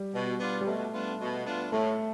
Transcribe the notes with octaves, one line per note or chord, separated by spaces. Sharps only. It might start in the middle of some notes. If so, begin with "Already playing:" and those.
Already playing: G3
B2
B3 D4 F4
G3
B2 A3
B3 D4 F4
B2
B3 D4 F4
A2 A3